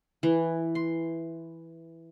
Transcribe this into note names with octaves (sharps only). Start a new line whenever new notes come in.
E3
C6